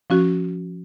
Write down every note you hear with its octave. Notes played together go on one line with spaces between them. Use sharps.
F3 C#4 F#4